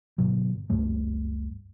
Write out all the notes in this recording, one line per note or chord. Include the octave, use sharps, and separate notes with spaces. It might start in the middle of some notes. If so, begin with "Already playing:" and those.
G1 B2 F#3
F#1 C#2 G2 A3